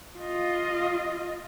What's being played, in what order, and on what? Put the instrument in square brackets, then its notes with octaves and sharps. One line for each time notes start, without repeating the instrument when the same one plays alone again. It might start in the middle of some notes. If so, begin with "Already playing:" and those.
[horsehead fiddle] F4 D#5